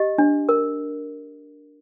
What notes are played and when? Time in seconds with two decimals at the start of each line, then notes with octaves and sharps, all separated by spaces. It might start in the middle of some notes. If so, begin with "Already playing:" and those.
Already playing: G4 D#5
0.18 D4
0.49 A#4